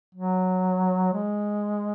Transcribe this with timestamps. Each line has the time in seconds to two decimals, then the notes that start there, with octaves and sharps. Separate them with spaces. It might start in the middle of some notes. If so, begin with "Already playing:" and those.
0.15 F#3
1.13 G#3